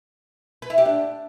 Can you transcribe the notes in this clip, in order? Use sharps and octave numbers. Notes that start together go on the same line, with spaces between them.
B4
E4
G4
D4